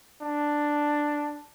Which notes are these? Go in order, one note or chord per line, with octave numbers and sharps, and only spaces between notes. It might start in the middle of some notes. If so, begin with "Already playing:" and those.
D4